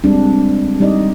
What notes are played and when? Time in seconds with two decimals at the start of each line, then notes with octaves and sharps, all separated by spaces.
0.04 G3 G#3 C4 D4
0.80 G3 D#4 D5 D#5